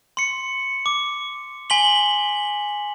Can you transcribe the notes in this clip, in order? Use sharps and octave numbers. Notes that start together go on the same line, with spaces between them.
C6 C#7
D6
G#5 C6 B6 F#7 G7